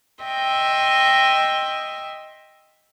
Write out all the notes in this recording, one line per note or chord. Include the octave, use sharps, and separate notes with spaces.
D#5 E5 G5 C6